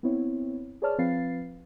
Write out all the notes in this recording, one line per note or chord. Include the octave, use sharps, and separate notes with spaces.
B3 C4 E4 C#5
G#4 B4 C#5 D5 A5 F6
F3 C4 B4 F5 A6 C7